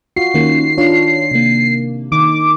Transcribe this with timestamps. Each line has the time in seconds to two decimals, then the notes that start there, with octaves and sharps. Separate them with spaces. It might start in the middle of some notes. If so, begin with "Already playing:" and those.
0.16 F4 F#4 C7
0.34 D#3 A#3 C#4
0.78 D4 F4 C#5
1.31 C3 A#3
2.12 D#3 D6